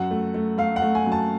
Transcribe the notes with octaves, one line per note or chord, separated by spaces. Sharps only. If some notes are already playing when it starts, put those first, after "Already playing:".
Already playing: F#2 F#5
A3
A3
A3 F5
F#5
A3
G#5
F#2
A5